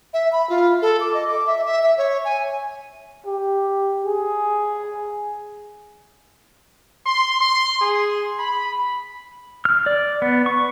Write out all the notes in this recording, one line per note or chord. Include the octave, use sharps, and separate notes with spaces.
E5
B5
F4
A4
D6
D#5
D6
E5
E5
E5
C#5
G#5
G4
G#4
C6
C6
G#4
B5
F6
D5
B3
C#6